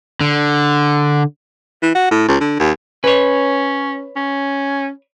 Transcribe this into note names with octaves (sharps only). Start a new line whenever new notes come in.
D3
E3
F#4
A2
C#2
D3
D#2
C#4 B4 C#5
C#4